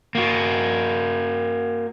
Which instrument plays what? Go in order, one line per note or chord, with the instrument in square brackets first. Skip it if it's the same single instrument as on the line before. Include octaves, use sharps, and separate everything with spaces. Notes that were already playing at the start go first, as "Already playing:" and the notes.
[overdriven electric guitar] A#3 F#4